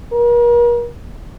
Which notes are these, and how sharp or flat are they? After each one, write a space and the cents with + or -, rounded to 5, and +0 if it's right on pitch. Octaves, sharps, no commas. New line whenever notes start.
A#4 +40